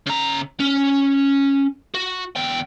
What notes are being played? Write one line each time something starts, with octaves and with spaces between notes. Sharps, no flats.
C#3 A#5
C#4
F#4
E2 G5